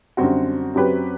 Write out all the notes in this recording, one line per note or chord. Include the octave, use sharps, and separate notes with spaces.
F#2 D3 G3 C4 F#4
F#2 F#3 C4 G4 B4